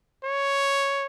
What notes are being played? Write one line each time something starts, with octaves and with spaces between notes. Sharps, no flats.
C#5